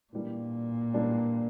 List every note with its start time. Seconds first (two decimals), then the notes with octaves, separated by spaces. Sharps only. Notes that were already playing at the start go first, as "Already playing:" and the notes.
0.13 A#2 E3 G3 A#3 D4
0.93 E3 G3 A#3 D4